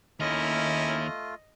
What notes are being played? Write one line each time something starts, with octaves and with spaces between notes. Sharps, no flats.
D#2 A3 A#3 C#4 E4 F4 D#5